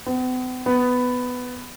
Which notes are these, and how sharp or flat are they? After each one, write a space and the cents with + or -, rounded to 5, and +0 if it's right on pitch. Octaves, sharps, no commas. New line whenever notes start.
B3 +45
B3 +10